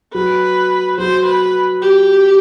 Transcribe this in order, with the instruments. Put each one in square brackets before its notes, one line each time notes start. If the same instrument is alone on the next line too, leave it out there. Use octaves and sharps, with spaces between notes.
[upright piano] F#3 [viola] B4
[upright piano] F#3 [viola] C5
[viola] B4
G4